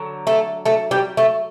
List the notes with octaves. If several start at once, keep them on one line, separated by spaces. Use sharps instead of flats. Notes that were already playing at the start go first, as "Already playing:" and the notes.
Already playing: D3 F#3
A3 A4
A3 A4
G3 G4
A3 A4